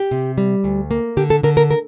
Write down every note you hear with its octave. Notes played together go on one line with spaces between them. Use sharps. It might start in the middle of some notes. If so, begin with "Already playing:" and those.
Already playing: G4
C3
G3
D2
A#3
D3 G4
A4
D3 A#4
A#4
A#4